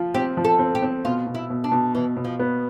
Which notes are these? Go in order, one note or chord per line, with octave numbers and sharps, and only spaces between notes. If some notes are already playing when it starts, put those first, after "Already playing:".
Already playing: F3 F4
C4 G4
F3
A4
C4
G4
C4
B2 F4
B2
E4
B2
D4
B2
B2 E3
B2
F3
B3